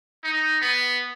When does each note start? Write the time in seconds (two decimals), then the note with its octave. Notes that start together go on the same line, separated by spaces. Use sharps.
0.24 D#4
0.61 B3